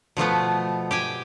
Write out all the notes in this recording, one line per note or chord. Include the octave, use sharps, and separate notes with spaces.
B2 F3 A3 B3
G4 G5 G#5